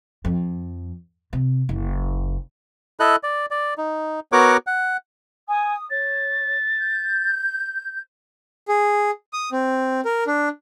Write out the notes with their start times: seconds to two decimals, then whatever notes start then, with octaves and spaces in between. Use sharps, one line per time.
0.25 F2
1.33 C3
1.69 F#1
3.00 E4 A4 D#5 F#6
3.23 D5
3.51 D5
3.78 D#4
4.32 B3 F#4 A#4 C#5 F#5 D6
4.67 F#5
5.48 G#5 D#6
5.90 C#5 A6
6.78 G6
8.68 G#4
9.33 D#6
9.52 C4
10.05 A#4
10.27 D4